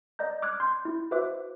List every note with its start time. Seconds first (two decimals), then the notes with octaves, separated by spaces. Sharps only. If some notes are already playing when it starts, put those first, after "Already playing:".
0.19 D5 D#5 A#5 G6
0.42 D6 F6 F#6 G#6
0.60 C6 G6
0.85 E4
1.11 F#4 B4 C5 E5 D6 F#6